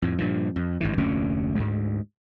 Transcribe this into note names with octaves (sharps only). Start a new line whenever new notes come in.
F2 A2
G2 A#2 F3
F2
G#1 G2 E3
F1 D2 A#2 C#4
D2 G#2